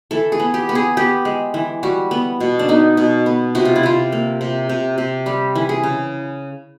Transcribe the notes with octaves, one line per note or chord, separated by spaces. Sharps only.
E3 A4
G#4
B3
G4
B3
G#4
B3 G4
G#3
E3
G3 F#4
B3
B2
D4
B3 D#4
B2
B3
C3 F#4
F4
E4
C3 F4
A#3
C3
C3
C3
G3 G4
E3
G#4
C#3